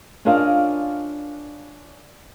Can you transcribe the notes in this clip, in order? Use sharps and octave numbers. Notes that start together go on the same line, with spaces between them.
C#4 D4 F4 A#4 D#5 F5